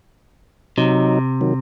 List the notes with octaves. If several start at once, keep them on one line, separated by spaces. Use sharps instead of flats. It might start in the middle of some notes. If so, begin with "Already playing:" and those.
C3 F#3 D#4
D#3 F#3